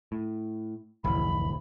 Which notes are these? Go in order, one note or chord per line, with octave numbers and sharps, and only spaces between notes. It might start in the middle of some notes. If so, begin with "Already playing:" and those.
A2
D1 C2 F2 E3 B5